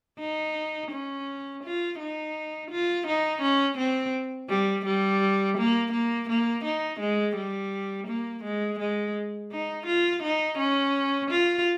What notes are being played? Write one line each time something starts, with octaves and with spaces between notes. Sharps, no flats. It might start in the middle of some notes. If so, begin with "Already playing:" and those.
D#4
C#4
F4
D#4
F4
D#4
C#4
C4
G3
G3
A#3
A#3
A#3
D#4
G#3
G3
A#3
G#3
G#3
D#4
F4
D#4
C#4
F4